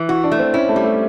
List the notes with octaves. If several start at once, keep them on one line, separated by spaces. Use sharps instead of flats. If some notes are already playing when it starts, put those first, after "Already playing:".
Already playing: E3
E4 F#4
D4
A3
C4
C#4 E4
A3
G3
A3